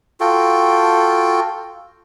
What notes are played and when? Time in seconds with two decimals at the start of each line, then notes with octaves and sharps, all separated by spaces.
0.20 F4 F#4 A4 G5